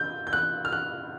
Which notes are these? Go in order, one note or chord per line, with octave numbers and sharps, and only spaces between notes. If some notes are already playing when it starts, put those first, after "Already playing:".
Already playing: G6
G6
F#6
F6
F#6